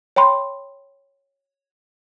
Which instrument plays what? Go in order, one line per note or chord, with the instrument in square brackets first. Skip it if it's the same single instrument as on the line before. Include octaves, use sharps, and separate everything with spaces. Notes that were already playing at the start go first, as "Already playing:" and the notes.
[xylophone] C#5 G5 B5 C6